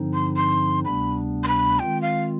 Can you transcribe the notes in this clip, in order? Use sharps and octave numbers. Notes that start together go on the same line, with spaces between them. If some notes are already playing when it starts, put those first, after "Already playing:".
Already playing: G2 D3 F3 C4 D#4
C6
C6
D2 C3 G3 B3 D4 B5
C6
B5
D#3 G#3 C4 F4 G5
F5